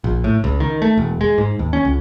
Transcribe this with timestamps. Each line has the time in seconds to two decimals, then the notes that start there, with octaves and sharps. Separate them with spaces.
0.04 A#1
0.24 A2
0.44 C#2
0.60 D#3
0.82 A3
0.97 E1
1.21 G#3
1.38 G#2
1.59 D#2
1.73 C#4
1.85 C#2